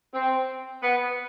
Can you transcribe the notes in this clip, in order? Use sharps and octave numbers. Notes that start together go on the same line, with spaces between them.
C4
B3